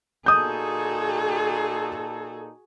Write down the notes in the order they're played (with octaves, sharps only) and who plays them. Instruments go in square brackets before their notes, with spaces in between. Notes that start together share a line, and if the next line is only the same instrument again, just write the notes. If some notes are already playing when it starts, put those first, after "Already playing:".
[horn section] A#2 D#4 A4 [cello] F#4 G#4 [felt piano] D#6 G6